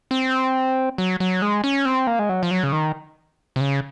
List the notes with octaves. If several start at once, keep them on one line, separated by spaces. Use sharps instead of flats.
C4
F#3
F#3
G#3
C#4
C4
A#3
G#3
F#3
F3
F#3
C#3
D#3
C3
C#3